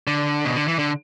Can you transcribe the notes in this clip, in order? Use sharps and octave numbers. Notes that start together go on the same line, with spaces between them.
D3
B2
D3
E3
D3